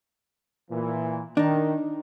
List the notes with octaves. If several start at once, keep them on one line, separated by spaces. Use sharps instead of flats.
A#2 E3
D#3 D4 D#4